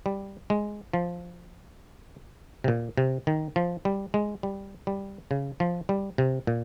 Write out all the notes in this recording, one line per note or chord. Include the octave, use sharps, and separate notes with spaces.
G3
G#3
F3
C3
A#2
C3
D#3
F3
G3
G#3
G3
G3
C#3
F3
G3
C3
A#2